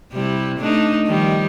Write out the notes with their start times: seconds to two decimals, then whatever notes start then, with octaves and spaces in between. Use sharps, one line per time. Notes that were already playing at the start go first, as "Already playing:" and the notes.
0.12 C3 G3 E4
0.58 A3 D4 D#4
1.06 D#3 F3 G3